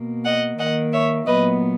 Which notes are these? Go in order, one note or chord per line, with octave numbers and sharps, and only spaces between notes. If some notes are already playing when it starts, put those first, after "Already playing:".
Already playing: B2 A#3
D#5 F#5
D#3 A#3 D#5 F#5
C#5 E5
A#2 F#3 B3 B4 D#5